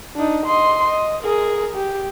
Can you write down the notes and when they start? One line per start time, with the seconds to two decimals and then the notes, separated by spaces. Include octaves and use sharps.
0.16 D4 D#4
0.46 D#5 C6
0.88 D#5
1.23 G#4 A#4
1.76 G4